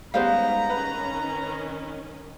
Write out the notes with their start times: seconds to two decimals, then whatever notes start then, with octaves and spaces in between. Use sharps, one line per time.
0.14 D#3 G3 G#3 B3 C#4 C5 F5 A#5
0.70 D#3 C#4 B4